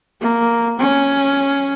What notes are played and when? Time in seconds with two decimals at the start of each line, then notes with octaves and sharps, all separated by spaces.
0.21 A#3
0.79 C#4